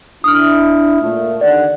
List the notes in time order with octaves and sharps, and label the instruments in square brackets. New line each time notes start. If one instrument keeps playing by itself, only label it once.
[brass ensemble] D4 E4 [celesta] D#6 F6
[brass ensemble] A#2 A3
[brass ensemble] D#2 D3 F#5 [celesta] D5